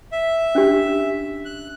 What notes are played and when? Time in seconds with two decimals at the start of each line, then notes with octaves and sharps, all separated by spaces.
0.12 E5
0.55 C#4 D4 G4
1.45 F#6